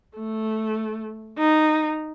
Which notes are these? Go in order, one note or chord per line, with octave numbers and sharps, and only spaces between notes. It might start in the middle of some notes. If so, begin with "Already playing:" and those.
A3
D#4